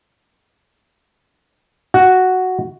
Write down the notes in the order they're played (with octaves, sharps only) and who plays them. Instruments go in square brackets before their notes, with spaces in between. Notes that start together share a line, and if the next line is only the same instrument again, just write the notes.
[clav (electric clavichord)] F#4